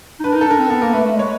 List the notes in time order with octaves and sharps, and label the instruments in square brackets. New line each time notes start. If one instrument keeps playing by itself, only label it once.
[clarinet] D#4
[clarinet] D4 [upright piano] B4
[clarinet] D#4 [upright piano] A#4
[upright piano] A4
[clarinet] D4 [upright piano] A#4
[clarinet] C4
[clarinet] B3 [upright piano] A4
[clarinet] A#3 [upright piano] A#4
[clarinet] A3 [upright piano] B4
[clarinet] A3
[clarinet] G#3 [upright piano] C#5